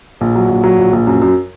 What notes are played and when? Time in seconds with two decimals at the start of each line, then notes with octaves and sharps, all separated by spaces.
0.21 A#1
0.35 F#3
0.49 A#1
0.64 F#3
0.78 A#1
0.93 A#1
1.07 F#2
1.22 F#2